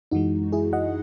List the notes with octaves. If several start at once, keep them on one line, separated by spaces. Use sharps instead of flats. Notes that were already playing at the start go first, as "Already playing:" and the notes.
F#2 E3 G#3 D#4 F#4
E4 G#4
D#5 F#5